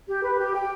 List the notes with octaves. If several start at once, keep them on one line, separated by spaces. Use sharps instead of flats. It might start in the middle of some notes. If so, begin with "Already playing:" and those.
G4
B4
G4
G5